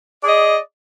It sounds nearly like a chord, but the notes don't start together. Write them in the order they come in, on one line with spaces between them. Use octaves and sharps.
D5 G#4 D#5